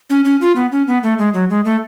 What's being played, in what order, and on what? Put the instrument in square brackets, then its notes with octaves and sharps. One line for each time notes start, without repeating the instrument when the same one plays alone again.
[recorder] C#4
C#4
F4
B3
C#4
B3
A3
G#3
F#3
G#3
A3